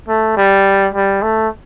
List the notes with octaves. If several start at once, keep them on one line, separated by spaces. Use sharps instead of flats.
A3
G3
G3
A3